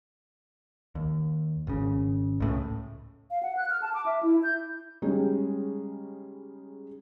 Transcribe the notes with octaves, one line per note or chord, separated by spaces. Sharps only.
D#2
G#1 C#3
C#2 A2 C#3
F5
F#5
F#6
F6
A5
D6
E5
E4
G6
C#3 G3 G#3 C#4 D#4